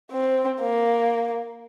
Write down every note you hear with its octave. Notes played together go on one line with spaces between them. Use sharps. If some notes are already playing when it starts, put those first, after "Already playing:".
C4
A#3